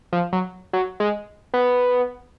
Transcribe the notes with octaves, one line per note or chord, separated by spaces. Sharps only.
F3
F#3
F#3
G#3
B3